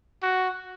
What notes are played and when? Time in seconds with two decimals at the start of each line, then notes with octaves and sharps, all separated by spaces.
0.23 F#4